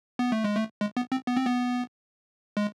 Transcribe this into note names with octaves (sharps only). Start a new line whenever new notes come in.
B3
A3
G#3
A3
G#3
B3
C4
B3
C4
B3
G#3